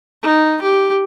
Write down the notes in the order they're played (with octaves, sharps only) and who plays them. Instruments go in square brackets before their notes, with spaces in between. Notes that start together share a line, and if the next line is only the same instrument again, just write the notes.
[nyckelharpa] D#4
G4